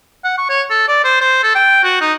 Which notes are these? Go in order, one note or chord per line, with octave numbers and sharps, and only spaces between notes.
F#5
C#6
C#5
A4
D5
C5
C5
A4
G5
F#4
D#4